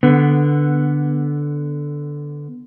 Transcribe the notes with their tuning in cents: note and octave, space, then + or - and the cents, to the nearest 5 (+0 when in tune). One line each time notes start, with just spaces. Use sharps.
D3 +0 B3 +0